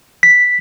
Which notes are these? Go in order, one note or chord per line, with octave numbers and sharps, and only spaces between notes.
B6